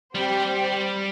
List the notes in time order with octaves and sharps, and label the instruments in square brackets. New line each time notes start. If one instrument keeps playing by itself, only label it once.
[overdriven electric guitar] G3 [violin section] C4 G4 C5 G5